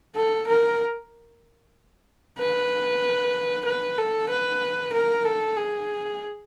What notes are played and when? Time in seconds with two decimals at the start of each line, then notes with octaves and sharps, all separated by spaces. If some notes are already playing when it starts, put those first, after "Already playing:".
0.15 A4
0.48 A#4
2.38 B4
3.66 B4
3.98 A4
4.30 B4
4.93 A#4
5.25 A4
5.57 G#4